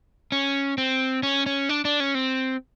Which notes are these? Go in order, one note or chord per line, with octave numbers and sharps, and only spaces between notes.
C#4
C4
C#4
C#4
D4
D4
C#4
C4